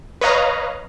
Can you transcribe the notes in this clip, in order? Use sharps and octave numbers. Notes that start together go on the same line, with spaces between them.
B4 C#5 D#5 F5 A#5